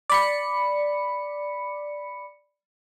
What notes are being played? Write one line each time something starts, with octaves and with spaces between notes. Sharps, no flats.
D5 B5 C#7